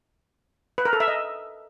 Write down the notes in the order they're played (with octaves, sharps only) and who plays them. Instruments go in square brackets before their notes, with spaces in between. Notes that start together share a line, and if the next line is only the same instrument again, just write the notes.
[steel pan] B4
A#4
A4
E5
D#5